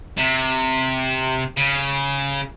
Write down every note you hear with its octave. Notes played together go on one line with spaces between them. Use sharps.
C3
C#3